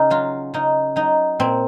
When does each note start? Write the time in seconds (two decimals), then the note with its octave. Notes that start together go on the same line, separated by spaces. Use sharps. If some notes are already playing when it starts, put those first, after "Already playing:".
Already playing: C#3 C#4 D#4
0.10 F#3 F4
0.54 C#3 D#4
0.96 F#3 D#4
1.40 A#2 C4